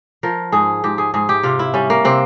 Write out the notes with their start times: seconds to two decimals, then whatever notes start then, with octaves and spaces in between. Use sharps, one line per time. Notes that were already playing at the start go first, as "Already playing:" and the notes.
0.23 F3 A#4
0.52 G#2 G#4
0.84 G#2 G4
0.98 G#4
1.14 G#2 G#4
1.29 G4
1.43 C3 F4
1.59 E4
1.74 G3 C#4
1.90 A#3
2.05 C3 C4